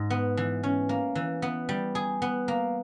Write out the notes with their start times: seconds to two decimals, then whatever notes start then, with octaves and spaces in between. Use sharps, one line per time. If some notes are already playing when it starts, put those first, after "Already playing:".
Already playing: G#2
0.10 B3
0.37 E3
0.63 C#4
0.89 A#3
1.15 E3
1.42 B3
1.69 G3
1.95 G#4
2.22 B3
2.48 A#3